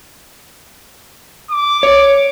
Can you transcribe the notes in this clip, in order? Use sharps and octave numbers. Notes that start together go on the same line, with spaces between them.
D6
C#5